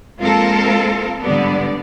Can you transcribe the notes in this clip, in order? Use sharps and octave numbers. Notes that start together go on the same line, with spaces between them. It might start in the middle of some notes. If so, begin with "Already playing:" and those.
G#3 A#3 C4 F4 A4 A#4
G#2 D3 G3 B3 D5